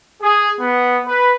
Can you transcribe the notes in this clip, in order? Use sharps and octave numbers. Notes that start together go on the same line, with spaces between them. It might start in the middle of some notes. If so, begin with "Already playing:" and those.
G#4
B3
B4